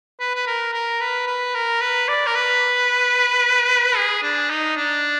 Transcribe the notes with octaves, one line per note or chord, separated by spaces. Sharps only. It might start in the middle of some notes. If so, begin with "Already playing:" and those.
B4
B4
A#4
A#4
B4
B4
A#4
B4
D5
A#4
B4
G#4
D4
D#4
D4